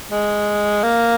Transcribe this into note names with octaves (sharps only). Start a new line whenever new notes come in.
G#3
A#3